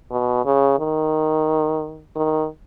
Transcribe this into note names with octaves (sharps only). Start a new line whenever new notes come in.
B2
C#3
D#3
D#3